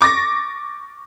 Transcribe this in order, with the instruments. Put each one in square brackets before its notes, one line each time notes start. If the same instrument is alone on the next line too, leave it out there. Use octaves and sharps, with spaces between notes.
[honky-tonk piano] C#6 D6 A6 A#6